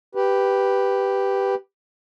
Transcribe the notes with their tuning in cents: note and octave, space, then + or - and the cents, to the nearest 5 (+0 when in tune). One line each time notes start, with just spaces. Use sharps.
G4 +0 B4 +0